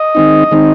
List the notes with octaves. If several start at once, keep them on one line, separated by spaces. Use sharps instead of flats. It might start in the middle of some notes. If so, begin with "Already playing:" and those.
Already playing: D#5
D#3 G#3 C4 D#4
D#3 G#3 C4 D#4